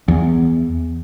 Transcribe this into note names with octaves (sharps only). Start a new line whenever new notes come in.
E2